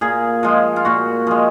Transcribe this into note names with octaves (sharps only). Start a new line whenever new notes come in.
A#2 G#4
F3 G#3
F4
A#2 F#4
F3 G#3